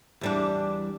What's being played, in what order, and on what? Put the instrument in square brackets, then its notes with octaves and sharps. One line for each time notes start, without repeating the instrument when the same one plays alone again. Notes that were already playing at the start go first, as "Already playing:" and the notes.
[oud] E2 G3 D4